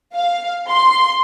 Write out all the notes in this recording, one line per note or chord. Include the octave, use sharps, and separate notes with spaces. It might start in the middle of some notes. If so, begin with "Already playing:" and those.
F5
C6